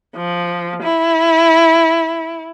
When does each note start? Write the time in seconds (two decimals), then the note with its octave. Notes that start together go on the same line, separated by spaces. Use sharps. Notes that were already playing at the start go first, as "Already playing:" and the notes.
0.16 F3
0.83 E4